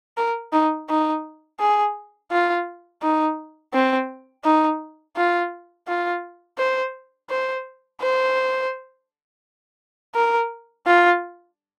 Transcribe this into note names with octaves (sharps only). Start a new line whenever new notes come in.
A#4
D#4
D#4
G#4
F4
D#4
C4
D#4
F4
F4
C5
C5
C5
A#4
F4